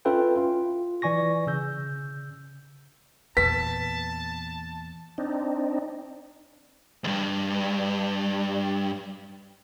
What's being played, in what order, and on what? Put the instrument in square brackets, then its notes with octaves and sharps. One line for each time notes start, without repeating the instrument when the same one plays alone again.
[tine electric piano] C#4 F4 A4 B4 E5 G5
F4
E3 D5 G#5 C#6 A#6
C#3 E6 G6
[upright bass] E2 A#2 [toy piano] B4 [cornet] A5 [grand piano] B6
[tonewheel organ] C4 D4 D#4
[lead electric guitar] D2 G2